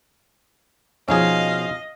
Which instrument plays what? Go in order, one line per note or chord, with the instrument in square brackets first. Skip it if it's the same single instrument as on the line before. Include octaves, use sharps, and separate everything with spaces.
[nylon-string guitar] B2 F3 [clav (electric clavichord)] C#4 D#4 G#4 [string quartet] D#5 [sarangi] F5